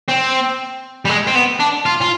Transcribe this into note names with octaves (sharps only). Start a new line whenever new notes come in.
C4
G3
G#3
C4
B3
D4
F4
F4